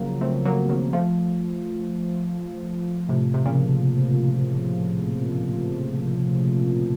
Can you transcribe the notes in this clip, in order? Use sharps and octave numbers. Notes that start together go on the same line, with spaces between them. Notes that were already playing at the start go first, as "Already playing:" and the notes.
Already playing: C#3 F3 F#3 A#3
A3 C4
F#3 A#3
D#3 F#3
F3 A3
A2 C3
C3
A#2 C#3